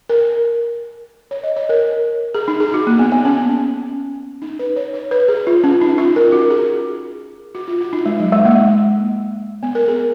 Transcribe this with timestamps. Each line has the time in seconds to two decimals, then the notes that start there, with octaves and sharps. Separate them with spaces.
0.09 A#4
1.31 C#5
1.44 D#5
1.56 C#5
1.69 A#4
2.35 G#4
2.48 D#4
2.60 G#4
2.74 F#4
2.87 A#3
2.99 B3
3.12 B3
3.25 C#4
4.42 D#4
4.59 B4
4.76 C#5
4.94 C#5
5.11 B4
5.28 G#4
5.47 F4
5.64 C#4
5.81 D#4
5.98 F4
6.16 A#4
6.32 F#4
6.50 G#4
7.55 F#4
7.68 F4
7.81 F#4
7.93 D#4
8.06 G#3
8.20 F#3
8.33 G#3
8.45 A#3
9.63 B3
9.75 A#4
9.88 G#4